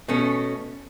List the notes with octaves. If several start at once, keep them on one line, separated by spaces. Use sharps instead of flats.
B2 A3 C#4